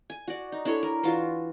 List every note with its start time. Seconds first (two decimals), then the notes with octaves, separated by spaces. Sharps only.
0.10 G#5
0.28 F#4 D5
0.52 D#4
0.65 D4 E4 A4 C#5
0.83 A#4
1.03 E3 F4 F#4 A5